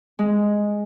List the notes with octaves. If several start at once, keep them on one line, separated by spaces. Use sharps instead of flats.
G#3